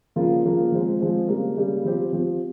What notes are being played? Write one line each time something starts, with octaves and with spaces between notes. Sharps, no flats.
C#3 F3 A#3 F4
C#3 F3 A#3 F4
F3 G#3 C4
F3 G#3 C4
C#3 G3 A#3
C#3 G3 A#3
F3 C4 G4
F3 C4 G4